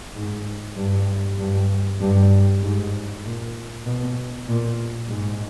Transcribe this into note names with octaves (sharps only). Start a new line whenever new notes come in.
G#2
G2
G2
G2
G#2
A#2
B2
A#2
G#2